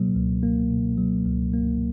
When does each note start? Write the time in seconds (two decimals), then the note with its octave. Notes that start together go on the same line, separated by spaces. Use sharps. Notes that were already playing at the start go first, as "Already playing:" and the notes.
Already playing: B2 F#3 A#3
0.15 C#2
0.43 A#3
0.70 B2
0.97 F#3
1.25 C#2
1.53 A#3